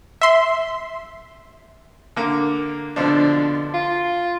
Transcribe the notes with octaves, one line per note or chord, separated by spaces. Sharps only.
E5 C6
D3 A#3
B2 D3 F3 D4
F4